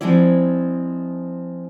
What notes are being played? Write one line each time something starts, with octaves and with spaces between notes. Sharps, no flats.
F3 G#3 C4 E4 D5